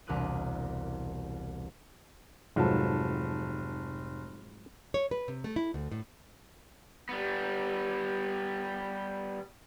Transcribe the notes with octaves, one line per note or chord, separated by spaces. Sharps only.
E1 C2 A#4 D6 F#6 D#7
F1 G#2 F3 F#3 A5
C#5
B4
C3
A3
E4
D2
A2
G3 B3